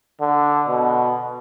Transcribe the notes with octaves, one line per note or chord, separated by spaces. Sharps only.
D3
B2